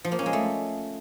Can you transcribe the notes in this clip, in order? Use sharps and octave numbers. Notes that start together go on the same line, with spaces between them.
F3
A#3
C#4
G#3
A3